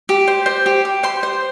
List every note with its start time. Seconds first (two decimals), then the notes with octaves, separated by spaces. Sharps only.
0.09 G4
0.28 C5
0.46 C5
0.66 G4
0.85 G4
1.03 C5 C6
1.23 C5